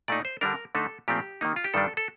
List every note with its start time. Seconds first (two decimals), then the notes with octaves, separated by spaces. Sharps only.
0.08 A#2 A3 D#4 D5
0.25 C5
0.41 D3 G3 D4 A#4
0.75 D3 A3 D#4 A4
1.08 A#2 F3 A3 C4 G4
1.41 D#3 A#3 D#4
1.56 F4
1.64 G4
1.74 G2 D#3 G3 D4 A4
1.97 A4